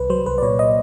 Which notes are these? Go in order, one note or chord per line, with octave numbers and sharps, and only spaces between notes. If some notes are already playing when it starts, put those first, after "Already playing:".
Already playing: C2 B4
F#3 C5
C2 B4
D5
A#2 C#5
D#5